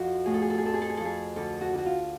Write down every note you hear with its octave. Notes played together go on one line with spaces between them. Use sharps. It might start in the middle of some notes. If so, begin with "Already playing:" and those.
Already playing: F2 F3 F#4
A2 G#4
A4
G#4
A4
G#4
F2 A4
G#4
A4
G#4
F2 A4
G#4
D2 A4
F#4
D2 F#4
F4